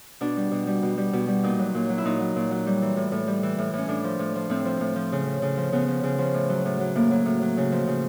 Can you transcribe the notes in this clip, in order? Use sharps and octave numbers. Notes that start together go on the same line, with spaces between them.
B2 D4
G3
B2
G3
B2
G3
B2
G3
A#2 D#4
F#3
A#2
F#3
E4
A#2 D#4
F#3
A#2
F#3
G3
E3
A2
A2
G3
E3
A2
A2 C#4
A2 D4
F3
A2
F3
A2 C4
F3
A2
F3
C#3
F3
C#3
F3
C#3 B3
F3
C#3
F3
A2
F#3
A2
F#3
A2 A#3
F#3
A2
F#3
C#3
F3
C#3